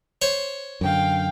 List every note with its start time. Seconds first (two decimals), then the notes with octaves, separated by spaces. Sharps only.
0.22 C5 C#5
0.81 F#2 D3 F5 G5